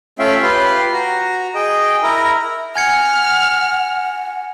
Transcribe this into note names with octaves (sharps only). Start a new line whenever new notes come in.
A3 C#4 F4 E5 F5 G5
F4 G4 B4 F5 C6
F#4 A#5
G#4 D#5 G5
E4 A#4 A#5
F#5 G#5 F6 G#6 C#7